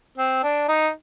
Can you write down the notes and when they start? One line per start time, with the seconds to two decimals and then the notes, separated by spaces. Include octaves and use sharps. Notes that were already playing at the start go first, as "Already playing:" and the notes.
0.18 C4
0.43 D4
0.69 D#4